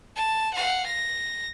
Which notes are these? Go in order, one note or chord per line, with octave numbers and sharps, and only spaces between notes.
A5
F5 F#5
A#6